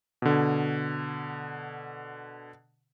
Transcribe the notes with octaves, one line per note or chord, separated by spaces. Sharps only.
B2 D3